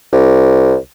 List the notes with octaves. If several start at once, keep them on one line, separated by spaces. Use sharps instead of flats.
C2